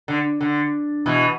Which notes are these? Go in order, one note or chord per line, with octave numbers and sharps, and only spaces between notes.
D3
D3
B2 E3